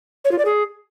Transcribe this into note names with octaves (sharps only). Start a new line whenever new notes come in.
C#5
F4
D5
G#4